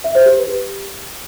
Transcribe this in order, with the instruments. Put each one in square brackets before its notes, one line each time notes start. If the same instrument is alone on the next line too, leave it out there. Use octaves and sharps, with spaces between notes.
[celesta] E5
C5
G4
B4
G4